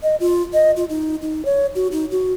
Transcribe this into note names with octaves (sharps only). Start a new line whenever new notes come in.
D#5
F4
D#5
F4
D#4
D#4
C#5
F#4
D#4
F#4